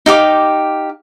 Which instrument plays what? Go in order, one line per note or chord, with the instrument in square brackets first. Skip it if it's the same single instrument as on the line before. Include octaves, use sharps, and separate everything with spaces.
[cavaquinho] D#4 G4 F5 D6